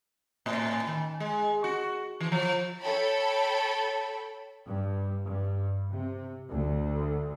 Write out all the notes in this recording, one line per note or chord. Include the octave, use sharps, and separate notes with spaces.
A2
D#3
G#3
F#4
E3
F3
A4 C#5 G5 A5 B5
G2
G2
C3
D2